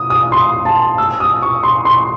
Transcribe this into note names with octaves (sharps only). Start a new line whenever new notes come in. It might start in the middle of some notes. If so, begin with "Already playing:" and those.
Already playing: D#6
D#6
C6
A5
E6
D#6
C#6
C6
C6